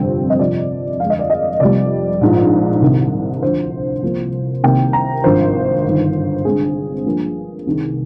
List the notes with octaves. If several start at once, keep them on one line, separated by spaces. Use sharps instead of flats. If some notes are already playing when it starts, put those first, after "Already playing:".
Already playing: G1 F2 C3 G3 C4
D#5
F2 C3 F3 D5
F2 D3 G#3 F5
D#5
D5
D#5
F1 F2 C3 G3 D5
A#1 G#2 F3
C2 C3 D#3
D2 D3 F3 C5
C2 C3 F3 A#3
C2 C3 D#3 A#3 G5
A#5
G#1 G2 F3 C5
G1 G2 D#3
G2 D3 G#3 C4 G#4
G2 F3 A#3
C2 C3 D#3